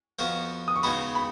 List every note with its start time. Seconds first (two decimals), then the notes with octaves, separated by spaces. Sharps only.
0.19 F2 F3 B3 F#4
0.68 D#6
0.76 C#6
0.83 C#3 G#3 B3 D#4 F#4 B5
1.15 B5